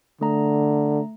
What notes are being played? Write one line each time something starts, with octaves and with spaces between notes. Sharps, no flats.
D3 A3 A#5